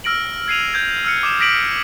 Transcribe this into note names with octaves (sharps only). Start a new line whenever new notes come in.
E6 F6 A#6 D7 F#7
G#6 C7 D#7 F7
E6 G6 G#6
E6 F6 C#7
D6 D#6 E7
D#6 A#6 B6 D7 F#7